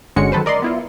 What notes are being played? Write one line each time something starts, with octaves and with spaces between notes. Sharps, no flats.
G1 D3 G#3 C#4 F#4 C#7
D#3 F#3 A4 B4 C5
A#4 D5 D#5 C6
B3 E4 F4